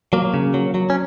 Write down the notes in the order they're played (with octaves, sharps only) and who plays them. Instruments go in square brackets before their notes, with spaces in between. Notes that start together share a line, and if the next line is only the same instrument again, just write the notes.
[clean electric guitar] F#3 A#3
C#3
F#3
F#3
C#4